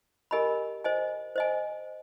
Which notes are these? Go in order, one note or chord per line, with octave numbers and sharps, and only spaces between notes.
G4 A#4 D#5 G#5 B5
C5 D#5 G#5
C5 D#5 G#5